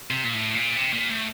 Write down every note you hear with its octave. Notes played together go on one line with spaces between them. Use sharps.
C3
A#2
A2
A#2
C3
A#2
A2